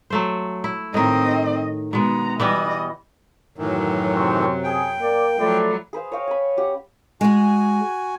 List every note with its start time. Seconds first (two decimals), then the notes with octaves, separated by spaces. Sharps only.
0.10 F#3 A3 C5
0.64 E4
0.94 A2 D#3 C4 D#5
1.93 B2 G#3 B3 A#5
2.40 E3 G3 B3 D#5
3.58 F#2 A2 D#3 E3 F#3
4.12 C3 C4 C#4
4.64 G#4 G5
5.00 A#3 D5
5.39 F3 F#3 A3 D5 B5
5.93 G#4 B4 C5 F5
6.12 C#5 D#5 F5 G5
6.27 G#5 B5
6.57 C#4 G4 F#5
7.21 G#3 F#4 G#4 G#5